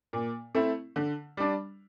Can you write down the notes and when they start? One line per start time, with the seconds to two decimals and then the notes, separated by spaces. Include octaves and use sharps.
0.13 A#2
0.55 A3 C4 E4
0.96 D3
1.37 G3 D4